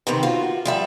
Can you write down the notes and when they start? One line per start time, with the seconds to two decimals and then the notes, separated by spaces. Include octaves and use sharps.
0.07 C3 D#3 E3 C4
0.23 F4 F#4
0.65 F3 G3 E5